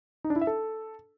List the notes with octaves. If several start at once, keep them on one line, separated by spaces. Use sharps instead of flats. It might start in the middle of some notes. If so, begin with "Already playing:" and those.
D#4
D4
E4
E5
A4